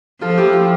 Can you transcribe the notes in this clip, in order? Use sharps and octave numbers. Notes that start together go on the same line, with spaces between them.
F3 F4 A4
E4 G4
F4